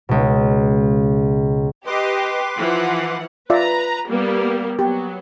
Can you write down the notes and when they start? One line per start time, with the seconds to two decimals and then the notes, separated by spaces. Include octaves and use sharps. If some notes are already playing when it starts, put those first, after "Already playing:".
0.09 C#2 B2
1.87 G4 B4 D#5 C6 D6
2.57 E3 F3 F#5
3.50 F4 B4 D5 E5 A#5
4.08 G3 A#3 B3
4.79 F#3 B3 G4